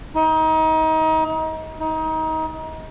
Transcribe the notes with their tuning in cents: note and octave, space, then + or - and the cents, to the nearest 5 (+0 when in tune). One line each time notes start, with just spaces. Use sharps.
D#4 +30
D#4 +25